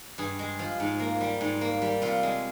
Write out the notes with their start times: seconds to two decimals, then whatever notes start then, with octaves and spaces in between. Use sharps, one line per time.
0.18 G2 G#4
0.39 G#3
0.59 F3
0.80 G#2
1.00 A#3
1.21 G3
1.41 G#2
1.61 A#3
1.82 G3
2.02 C3 F4
2.23 G#3